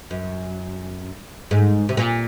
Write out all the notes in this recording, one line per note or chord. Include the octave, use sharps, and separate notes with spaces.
F#2
G#2
C3
A#2